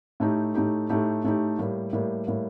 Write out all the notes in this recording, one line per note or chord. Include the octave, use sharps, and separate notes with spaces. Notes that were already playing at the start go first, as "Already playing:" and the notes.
A2 A3 D#4 G4
A2 A3 D#4 G4
A2 A3 D#4 G4
A2 A3 D#4 G4
A2 G3 A#3
A2 G3 A#3
A2 G3 A#3